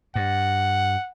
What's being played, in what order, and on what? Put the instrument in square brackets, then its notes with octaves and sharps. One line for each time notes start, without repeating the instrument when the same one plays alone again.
[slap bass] G2 [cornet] F#5